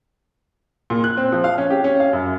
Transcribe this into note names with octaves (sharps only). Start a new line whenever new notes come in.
A#2
F#6
C4
F3
F5
C#4
G4
C#4
F5
F#2